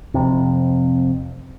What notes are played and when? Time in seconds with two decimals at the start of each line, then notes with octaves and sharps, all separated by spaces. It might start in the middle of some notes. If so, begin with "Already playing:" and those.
0.14 F2 C3